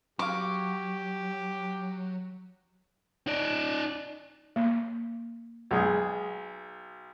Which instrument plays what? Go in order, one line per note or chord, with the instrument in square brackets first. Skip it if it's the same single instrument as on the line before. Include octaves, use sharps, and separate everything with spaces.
[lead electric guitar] F#3 [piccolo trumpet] G4 [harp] F5 C#6 [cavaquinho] D6
[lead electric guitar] D#4 D5
[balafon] A#3
[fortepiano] B1 G#3 G#4